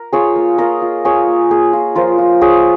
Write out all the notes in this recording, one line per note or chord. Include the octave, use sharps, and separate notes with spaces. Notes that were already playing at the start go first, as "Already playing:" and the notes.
Already playing: A#4
F4 G#4 C#5
A#3
F4 A#4 D#5
F4
F4 G#4 C#5
A#3
A#3 G#4
F4
F3 F4 A#4
F4
F4 G#4 C#5